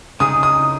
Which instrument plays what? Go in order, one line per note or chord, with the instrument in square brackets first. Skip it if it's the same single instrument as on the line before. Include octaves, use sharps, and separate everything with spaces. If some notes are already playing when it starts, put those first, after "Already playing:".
[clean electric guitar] C#3 G#3 D#4 G#4 [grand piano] D#6
[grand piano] D#6